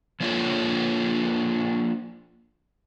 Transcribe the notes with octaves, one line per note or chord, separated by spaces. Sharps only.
F3 A#3 D4 F4 A4 C#5